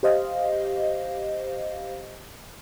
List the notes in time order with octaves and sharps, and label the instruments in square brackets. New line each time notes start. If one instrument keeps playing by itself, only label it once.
[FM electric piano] G4 C5 D#5 F5